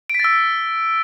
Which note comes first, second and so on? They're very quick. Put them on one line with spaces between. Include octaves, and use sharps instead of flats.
D7 B6 A6 E6